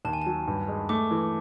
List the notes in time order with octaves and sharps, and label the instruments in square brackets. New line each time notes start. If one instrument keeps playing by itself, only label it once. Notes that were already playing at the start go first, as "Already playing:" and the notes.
[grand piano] D#2 [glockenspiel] A5
[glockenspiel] G#5
[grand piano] F#3 [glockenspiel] A5
[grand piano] G2
G#3
[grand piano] A3 [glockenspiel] D6
[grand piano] E3